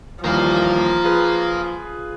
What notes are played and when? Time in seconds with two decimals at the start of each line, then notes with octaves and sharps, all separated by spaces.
0.24 D#2 E3 F3 G3 A#4 F5
1.04 F4 G#4 B4